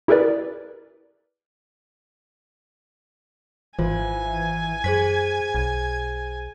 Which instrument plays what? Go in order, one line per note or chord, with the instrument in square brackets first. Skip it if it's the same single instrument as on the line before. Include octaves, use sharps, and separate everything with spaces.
[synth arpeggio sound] E4 G4 G#4 A#4 B4 D5
[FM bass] G#1 [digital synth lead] E3 [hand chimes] F4 C5 [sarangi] G#5
[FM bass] F#2 [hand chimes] G#4 C5 B6 [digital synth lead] G#6
[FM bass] B1